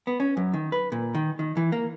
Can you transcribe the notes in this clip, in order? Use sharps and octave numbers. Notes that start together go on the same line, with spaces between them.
B3
C#4
F#2
D#3
B4
A#2
D#3
D#3
E3
A#3